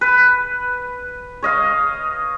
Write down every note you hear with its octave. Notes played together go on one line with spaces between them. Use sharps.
B4
C#5 D#5 F5